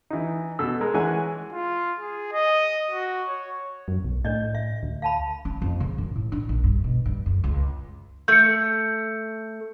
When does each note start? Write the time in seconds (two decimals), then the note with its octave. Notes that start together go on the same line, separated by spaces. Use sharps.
0.10 E3 D#4
0.59 B2 A4 E6
0.81 G#3 A#4
0.94 E3 G#3 C#5 F#5 G#5
1.53 F4
1.99 G#4
2.33 D#5
2.91 F#4
3.28 C#5
3.88 F#2
4.04 B1
4.25 A2 D4 D5 D#5
4.55 E5
4.83 D2
5.02 F5 A5 B5
5.45 C#4
5.62 F2
5.80 C#3
5.98 F#2
6.16 A2
6.32 D4
6.49 A#1
6.64 G2
6.84 B2
7.06 G2
7.26 F#2
7.44 C#2
8.28 A3 G6 C#7